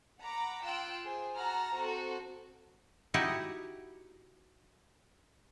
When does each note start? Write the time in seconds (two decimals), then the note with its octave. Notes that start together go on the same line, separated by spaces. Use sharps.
0.21 F#5 A#5 B5 D6
0.64 F4 G5 E6 F#6 D7
1.04 G#4 C5
1.36 F#4 F#5 A5 A#5 F6
1.72 C4 F#4 A4
3.14 D#4 E4 F#4 G4 D#5